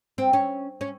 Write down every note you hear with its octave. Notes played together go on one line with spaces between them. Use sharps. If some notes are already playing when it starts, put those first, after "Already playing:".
C4
C#4
C#4